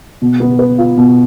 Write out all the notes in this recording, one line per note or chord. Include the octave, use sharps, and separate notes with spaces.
B2
B3
B4
F4
B2